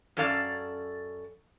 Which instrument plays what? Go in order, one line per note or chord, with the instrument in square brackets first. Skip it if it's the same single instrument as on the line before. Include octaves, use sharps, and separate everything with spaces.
[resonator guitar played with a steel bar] F#2 C#4 A4 D5 F5